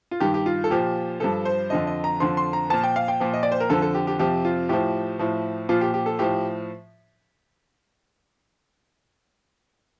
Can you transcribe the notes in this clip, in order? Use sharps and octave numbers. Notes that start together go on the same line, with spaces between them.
F4
G2 D#3 G4
G4
F4
A4
A#2 F3 G4
G2 F3 A4
C5
F2 D3 F3 D#5
D#5
A#5
F2 D3 F3 C6
C6
A#5
A#2 F3 A5
G5
F5
G5
A#2 F3
D#5
D5
C5
A#4
F2 D3 F3 A4
A4
G4
G4
F2 C3 F3 G4
F4
A2 F3 G4
A2 F3
A#2 F3 F4
G4
G4
A4
A2 F3 G4